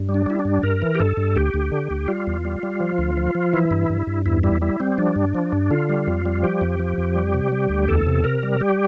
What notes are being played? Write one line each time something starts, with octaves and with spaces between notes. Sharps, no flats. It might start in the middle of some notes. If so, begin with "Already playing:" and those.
Already playing: G2
G3
D4
G3 E4
D4
G2
G2 A#4
E3
G4
G2 A4
G2
D2 G4
D2
D3
D2
G3 F4
E2
G3
G3
F3
D2
F3
F3
E3 E4
G2
G2
G2
E2 E4
G3 E4
G3 E4
G3 C4
F3 D4
G2
F3
G2
D3 F4
G3
F2
G3
F3 G4
F2
F3
F2
G3
C3
G3
D2
E2 A4
C3
C3 A#4
G3
G3 G4